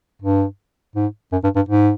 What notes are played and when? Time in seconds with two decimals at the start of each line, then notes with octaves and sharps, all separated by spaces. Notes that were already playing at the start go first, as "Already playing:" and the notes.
0.22 G2
0.96 G#2
1.32 F#2
1.44 G2
1.56 G2
1.69 G#2